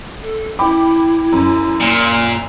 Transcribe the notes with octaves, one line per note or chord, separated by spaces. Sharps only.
A4
E4 G5 B5 D6
F#2
A#2